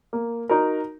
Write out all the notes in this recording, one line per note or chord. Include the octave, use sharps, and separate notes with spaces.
A#3
D#4 F#4 A#4